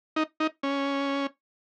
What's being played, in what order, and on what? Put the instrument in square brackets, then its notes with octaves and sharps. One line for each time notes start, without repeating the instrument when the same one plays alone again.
[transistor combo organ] D#4
D#4
C#4